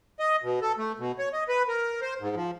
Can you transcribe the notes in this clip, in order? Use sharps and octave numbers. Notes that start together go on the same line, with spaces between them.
D#5
B2
A4
A3
B2
C#5
D#5
B4
A#4
C5
G#2
F3